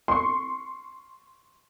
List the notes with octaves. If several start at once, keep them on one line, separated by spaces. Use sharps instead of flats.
C6 C#6